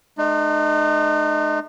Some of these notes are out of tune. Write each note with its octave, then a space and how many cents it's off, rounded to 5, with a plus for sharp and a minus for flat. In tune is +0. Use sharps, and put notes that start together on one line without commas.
G#3 +45 D#4 -40